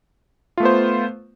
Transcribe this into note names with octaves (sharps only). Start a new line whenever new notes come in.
A3 B3 F4 C5